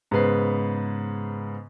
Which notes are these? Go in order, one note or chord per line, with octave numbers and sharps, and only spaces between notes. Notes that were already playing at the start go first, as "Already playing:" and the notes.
G#2 C#3 B3 B4 C5 C7